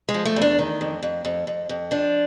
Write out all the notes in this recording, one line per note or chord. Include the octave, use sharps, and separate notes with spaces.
G#3
F3
A3
E2
D4
D#3
F2
F2
F2
F2
F2
F3 D4